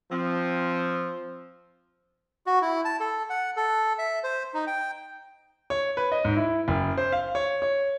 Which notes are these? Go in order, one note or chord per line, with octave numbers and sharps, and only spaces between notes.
F3 C4
F#4
E4
A5
A4
F#5
A4
E5
C5
D#4
G5
C#5
B4
D#5
G#2
E4
F#1
C5
F5
C#5
C#5